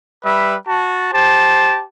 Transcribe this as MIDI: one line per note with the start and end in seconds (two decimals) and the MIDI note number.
0.24 0.55 55
0.24 0.55 71
0.24 0.55 76
0.66 1.12 66
0.66 1.12 81
1.13 1.83 67
1.13 1.83 72
1.13 1.83 81